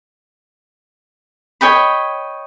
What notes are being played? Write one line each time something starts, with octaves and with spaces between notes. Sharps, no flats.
C#5 D#5 G5 B5